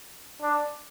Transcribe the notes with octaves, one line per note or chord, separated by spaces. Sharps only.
D4